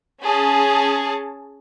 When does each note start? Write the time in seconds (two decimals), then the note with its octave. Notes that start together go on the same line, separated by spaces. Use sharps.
0.23 C#4 G#4 A5